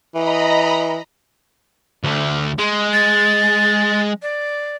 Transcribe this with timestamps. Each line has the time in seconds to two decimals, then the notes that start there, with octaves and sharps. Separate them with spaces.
0.15 E3 D#5 A#5 B5
2.04 D2 D3
2.58 G#3 C6
2.93 A6
4.22 D5